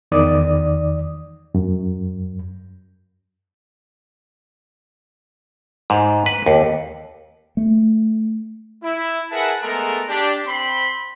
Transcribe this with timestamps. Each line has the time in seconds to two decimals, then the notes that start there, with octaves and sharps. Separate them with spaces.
0.12 E2 D#3 D5 D#6
1.55 F#2
5.90 G#2
6.26 B4
6.46 D#2
7.57 A3
8.84 E4
9.31 G#4 A#4 B4 E5 F#5 A5
9.62 G#3 A3 B3 A4 A#4
10.08 D4 G4
10.46 C4 B5 C6